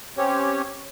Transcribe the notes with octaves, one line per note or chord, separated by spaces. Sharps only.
C4 C#4 G4 C#5